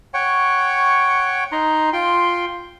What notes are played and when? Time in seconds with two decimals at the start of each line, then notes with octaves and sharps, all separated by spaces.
0.14 C#5 F#5 G5 C#6
1.52 D#4 A#5 C6
1.93 F4 G5 C6